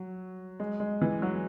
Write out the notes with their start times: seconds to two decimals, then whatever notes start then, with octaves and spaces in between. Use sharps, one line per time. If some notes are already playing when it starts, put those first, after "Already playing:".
Already playing: F#3
0.60 G#3
0.80 G#3
1.02 E3
1.22 F#3